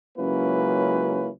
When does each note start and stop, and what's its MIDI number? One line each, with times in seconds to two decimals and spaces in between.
0.18 1.29 37
0.18 1.29 54
0.18 1.29 58
0.18 1.29 61
0.18 1.29 64
0.18 1.29 71